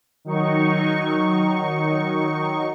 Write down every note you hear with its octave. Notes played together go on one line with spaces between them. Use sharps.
D#3 F#3 D#4 C#6